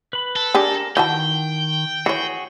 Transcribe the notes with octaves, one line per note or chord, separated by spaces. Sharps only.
B4 B5
A4
D4 G4 G#4 A#4
D#3 E3 F#4 G5 A5 G6
E3 F#4 G#4 C#5